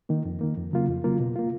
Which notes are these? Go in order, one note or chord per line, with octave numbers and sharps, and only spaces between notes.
D#3 A#3
F2
D#3 A#3
F2
C#3 F#3 A#3 F4
F2
C#3 F#3 A#3 F4
B2
A#3 F4